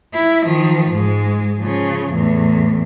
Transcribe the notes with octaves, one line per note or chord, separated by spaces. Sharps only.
E4
D#3 F3
G#2 G#3
C#3 F3
E2 A2